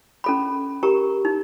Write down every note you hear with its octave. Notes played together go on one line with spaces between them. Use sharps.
C#4 A4 B5
G4 A#4 A#5 C#6
D#4